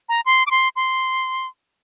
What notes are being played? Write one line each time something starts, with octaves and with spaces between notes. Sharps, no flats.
A#5
C6
D6
C6
C6